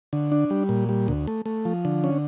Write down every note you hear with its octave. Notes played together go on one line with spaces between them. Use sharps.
D3
D4
G3
A#2
G3
D2
A3
A3
F3
D3
C#4